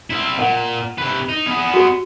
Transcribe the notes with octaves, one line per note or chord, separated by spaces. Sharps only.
C4 E4
A#2 F#5
C3 B4
D#4
B3 G#4
F#4 G4